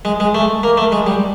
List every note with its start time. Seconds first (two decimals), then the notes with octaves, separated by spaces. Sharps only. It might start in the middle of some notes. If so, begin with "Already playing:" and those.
0.05 G#3
0.20 G#3
0.35 A3
0.63 A#3
0.77 A3
0.92 G#3
1.07 G3